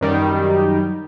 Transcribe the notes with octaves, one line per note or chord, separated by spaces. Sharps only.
F#2 D#3 G3